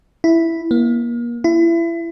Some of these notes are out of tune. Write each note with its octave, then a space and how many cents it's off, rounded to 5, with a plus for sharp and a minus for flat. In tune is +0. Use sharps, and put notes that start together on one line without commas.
E4 +0
A#3 +35
E4 +30